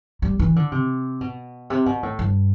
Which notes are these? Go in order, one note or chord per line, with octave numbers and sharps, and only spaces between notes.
G3
E3
D3
C3
B2
C3
B2
A2
G2